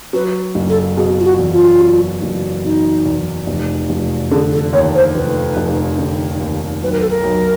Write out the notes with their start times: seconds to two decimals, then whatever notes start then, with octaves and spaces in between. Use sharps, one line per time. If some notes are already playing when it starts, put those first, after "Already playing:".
0.13 F#3 B4
0.55 F#1
0.69 A4
0.97 B2 G#4
1.20 F4
1.24 F#4
1.39 E2
1.53 F4
1.81 F#3
2.22 F#1
2.64 B2 D#4
3.06 E2
3.47 F1
3.90 F1
4.31 D3 G#4
4.52 A4
4.73 D#2 C#5
4.95 C5
5.14 F1 B4
5.57 F1
5.98 D3
6.41 D#2
6.83 B1 B4
6.91 A#4
7.00 A4
7.09 A#4
7.23 B1